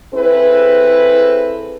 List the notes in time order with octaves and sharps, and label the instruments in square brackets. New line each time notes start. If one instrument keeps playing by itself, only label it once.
[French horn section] C4 E4 G#4 A4 B4